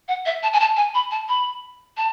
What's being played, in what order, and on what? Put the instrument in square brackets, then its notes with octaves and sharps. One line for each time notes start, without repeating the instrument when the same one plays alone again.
[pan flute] F#5
E5
A5
G#5
A5
G#5
B5
A5
B5
A5